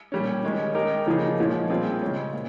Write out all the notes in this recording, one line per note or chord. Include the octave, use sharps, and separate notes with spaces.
A#2 G3 C#4
D#3 G#3 C#4
G#3 D#4 G4 A#4
C#3 F3 A#3 D#4 G#4
A#2 F3 G#3 C#4
A#2 G3 C4 F4 G#4
C#3 G#3 C#4
A#2